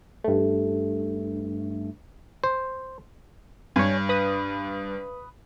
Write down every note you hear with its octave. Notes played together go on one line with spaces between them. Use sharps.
G2 A3
C5
G2 C#5 G#5
B4 B5 D#6